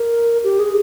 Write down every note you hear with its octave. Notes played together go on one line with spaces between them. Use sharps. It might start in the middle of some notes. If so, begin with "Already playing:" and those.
Already playing: A#4
G4
G#4